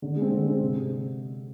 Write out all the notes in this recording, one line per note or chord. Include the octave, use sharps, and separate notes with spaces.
D3
G#3
C4
D3
G#3 C4
C3